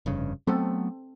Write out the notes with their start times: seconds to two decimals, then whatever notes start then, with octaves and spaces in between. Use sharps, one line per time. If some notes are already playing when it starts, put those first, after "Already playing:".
0.06 F1 G2 C#3
0.47 F#3 A3 B3 C4 A4